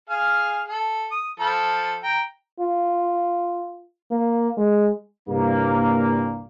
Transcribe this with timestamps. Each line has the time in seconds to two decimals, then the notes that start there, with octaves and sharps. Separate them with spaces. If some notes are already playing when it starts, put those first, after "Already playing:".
0.10 G#4 F5 F6
0.69 A4
1.11 D#6
1.40 F3 A4 B5
2.04 G5 A#5
2.60 F4
4.11 A#3
4.57 G#3
5.28 C2 G2 A#2 A#3